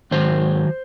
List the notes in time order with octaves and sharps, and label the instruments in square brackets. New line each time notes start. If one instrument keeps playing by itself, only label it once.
[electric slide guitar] G#2 D#3 F#3 C5